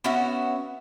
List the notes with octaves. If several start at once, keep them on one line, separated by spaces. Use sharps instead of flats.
B3 C#4 F#4 E5